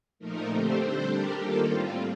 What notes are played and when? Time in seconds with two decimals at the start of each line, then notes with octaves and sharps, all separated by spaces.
0.19 A#2 F3 A3 D#4 A#4
0.48 D3 A3 C4 G4 C5
0.77 G3 D4 A4 C5
1.08 G3 D4 G4 A#4
1.37 D#3 A#3 F4 A4
1.67 A2 G3 C4 F4